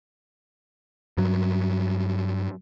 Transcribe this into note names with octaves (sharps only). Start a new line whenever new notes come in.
G2 F#3